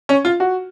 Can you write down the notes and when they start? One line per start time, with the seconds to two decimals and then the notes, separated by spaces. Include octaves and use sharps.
0.09 C#4
0.25 F4
0.40 F#4